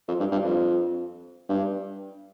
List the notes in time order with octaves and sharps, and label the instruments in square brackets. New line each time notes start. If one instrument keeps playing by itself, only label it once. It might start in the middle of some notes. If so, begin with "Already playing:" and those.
[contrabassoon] F2
G2
G2
F2
G2